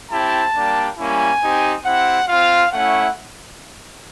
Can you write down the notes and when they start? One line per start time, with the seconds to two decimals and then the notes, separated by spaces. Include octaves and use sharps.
0.11 C4 E4 G4 A5
0.55 G3 A#3 D4 G4
0.98 G3 A#3 C#4 E4 G#5
1.42 C4 D#4 G4
1.85 C4 E4 G4 F#5
2.29 C4 F4 F5
2.72 A3 C#4 E4 F#5